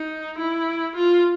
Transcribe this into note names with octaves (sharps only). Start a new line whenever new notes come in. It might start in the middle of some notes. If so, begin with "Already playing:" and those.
Already playing: D#4
E4
F4